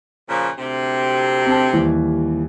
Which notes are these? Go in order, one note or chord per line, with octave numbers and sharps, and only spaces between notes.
A#2 C#3 F3
D2 C3
C4 A5
D#2 E3 G3